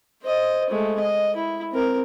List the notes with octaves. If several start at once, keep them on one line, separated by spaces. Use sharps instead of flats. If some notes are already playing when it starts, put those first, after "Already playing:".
C5 D#5
G#3 A3
D#5
E4
C4 A#4